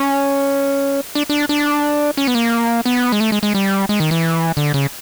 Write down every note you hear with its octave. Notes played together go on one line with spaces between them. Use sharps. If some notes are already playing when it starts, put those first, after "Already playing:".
Already playing: C#4
D4
D4
D4
C#4
B3
A#3
B3
G#3
A3
G#3
G#3
G3
G#3
D#3
E3
D3
C#3